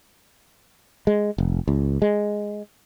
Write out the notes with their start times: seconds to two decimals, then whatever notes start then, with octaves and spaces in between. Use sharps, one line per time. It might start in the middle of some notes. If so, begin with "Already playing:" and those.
1.07 G#3
1.38 F1
1.68 C#2
2.02 G#3